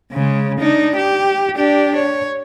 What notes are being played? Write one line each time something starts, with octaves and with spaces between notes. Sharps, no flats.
C#3 G#3
D4 D#4
G4
D4 G4
C#5